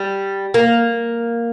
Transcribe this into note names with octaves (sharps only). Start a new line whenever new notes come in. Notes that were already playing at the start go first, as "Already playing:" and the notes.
Already playing: G3
A#3